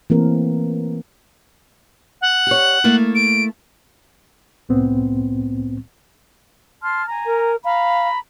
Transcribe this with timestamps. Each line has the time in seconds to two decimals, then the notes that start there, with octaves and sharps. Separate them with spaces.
0.10 E3 A3 A#3 C4 A#4
2.21 F#5
2.47 G4 C#5
2.84 A3 A#3 E4
3.15 D7
4.69 C2 A2 B3 C4
6.82 A5 C6 F6
7.07 G#5 A#5
7.26 A#4
7.65 F5 A#5 B5